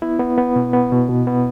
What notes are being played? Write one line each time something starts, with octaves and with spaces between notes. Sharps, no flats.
B3 E4
B3
B3
B2
B3
B2
B2
B3